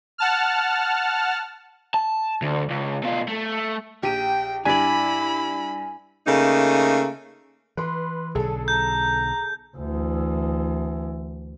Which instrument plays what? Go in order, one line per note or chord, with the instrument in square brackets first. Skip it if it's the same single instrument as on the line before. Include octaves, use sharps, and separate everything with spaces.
[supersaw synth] F#5 A5 F6
[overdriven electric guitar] A5
D2
C#2
B2 F4
A3
[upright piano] A#1 D#7 [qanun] G4 [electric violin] G5
[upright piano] G2 G#6 B6 [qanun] D4 D5 [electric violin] E4 B5 [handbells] G#5
[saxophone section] C#3 A3 A#3 D#4
[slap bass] E3 [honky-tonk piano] B4 C6
[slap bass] B1 D3 [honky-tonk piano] G#4 A4 A5
[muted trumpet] A#5 [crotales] G6
[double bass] D2 E3